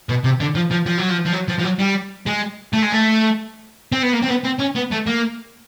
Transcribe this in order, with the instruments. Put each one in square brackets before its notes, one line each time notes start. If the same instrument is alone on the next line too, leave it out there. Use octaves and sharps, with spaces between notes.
[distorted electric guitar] B2
C3
D3
F3
F3
F3
F#3
F3
F3
F#3
F3
F3
F#3
G3
G#3
A3
G#3
A3
C4
B3
A#3
C4
B3
C4
C#4
B3
A3
A#3